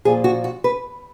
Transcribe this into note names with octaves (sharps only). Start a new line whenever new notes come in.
A#2 F3 G#4
F#4
F#4
B4